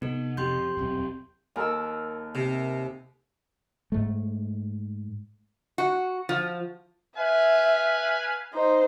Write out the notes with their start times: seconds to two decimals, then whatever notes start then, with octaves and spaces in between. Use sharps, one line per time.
0.02 C3 B3 D#4 A4
0.37 F2 G4 C6 G6
0.77 D#1 B1 E2 C4
1.56 D#2 A4 A#4 G#5 E6
2.35 C3
3.92 G#2 A3
5.78 F#4
6.29 F3
7.18 B4 E5 F5 G#5
8.53 D#4 C5